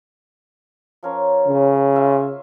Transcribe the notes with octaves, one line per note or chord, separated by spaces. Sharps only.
F3 C#4 A#4
C#3
F4 E5